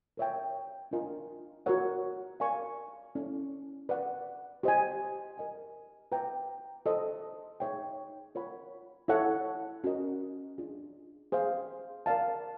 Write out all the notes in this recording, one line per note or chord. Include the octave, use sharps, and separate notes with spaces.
A#4 C#5 E5 G5
D4 F4 A#4 D#5 G#5
F#4 A#4 C#5 F#5
A#4 D5 F5 G#5 C#6
C#4 E4 A4 D5
B4 D5 F#5
G4 C5 D#5 G#5
A#4 D#5 G#5
B4 E5 G5 A#5
A4 C5 D#5
D#4 G#4 C#5 E5 G5
F4 A#4 C#5 F#5 B5
E4 A4 C#5 F#5
C#4 F#4 A#4 D#5
D4 F4 G#4
G#4 C5 F5
A#4 D5 F5 A5